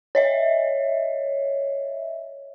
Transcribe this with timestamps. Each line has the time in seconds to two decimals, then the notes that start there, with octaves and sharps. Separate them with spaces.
0.15 C#5 D#5 E5